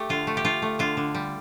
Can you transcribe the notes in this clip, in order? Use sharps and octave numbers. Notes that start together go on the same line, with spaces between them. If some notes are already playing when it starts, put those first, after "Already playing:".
Already playing: A3 G4
D3 F4
A3
G4
A3 F4
A3
D3 F4
D3
G3